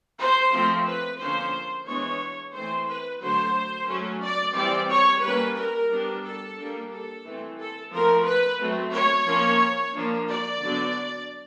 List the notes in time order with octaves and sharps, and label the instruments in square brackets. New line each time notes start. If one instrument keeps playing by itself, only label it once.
[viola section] C5
F3 A3 C4
B4
D3 F3 A#3 C#4 C5
E3 G#3 B3 D4 C#5
E3 A3 C4 C5
B4
D3 F#3 A3 C5
F#3 A3 C#4
D5
E3 G3 C4 D5
C#5
G3 A#3 C#4 B4
A#4
G3 B3 D4
A4
G3 A#3 D4
A4
E3 A3 C4
A4
F3 A3 C4 A#4
B4
F#3 A3 C4
C#5
F3 A#3 C#4
F3 A#3 D4
D5
D3 F#3 B3 D4